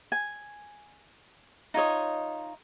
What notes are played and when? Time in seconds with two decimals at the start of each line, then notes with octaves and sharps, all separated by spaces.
0.12 G#5
1.74 D#4 F4 C#5 D#5